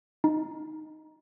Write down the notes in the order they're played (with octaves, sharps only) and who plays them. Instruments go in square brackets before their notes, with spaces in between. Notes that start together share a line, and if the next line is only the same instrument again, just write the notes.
[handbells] D#4